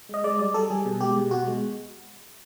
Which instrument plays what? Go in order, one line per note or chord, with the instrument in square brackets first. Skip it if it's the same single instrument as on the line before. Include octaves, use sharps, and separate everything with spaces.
[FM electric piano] G#3 D#5
G#3 D5
G3 D5
G3 A4
G3 G#4
B2
G#3 G4
B2
B2 F#4
G#3